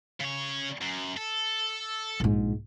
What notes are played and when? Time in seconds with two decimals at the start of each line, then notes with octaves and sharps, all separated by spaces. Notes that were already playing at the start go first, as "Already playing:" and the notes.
0.20 C#3 C#5
0.81 F#2
1.17 A4
2.20 A#1 G#2